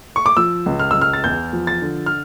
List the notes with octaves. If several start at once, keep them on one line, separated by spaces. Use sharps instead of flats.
C#6
D6
F3 E6
C#2
F6
C#2 E6
F6
A6
E2 G6
F3
A6
D3
F6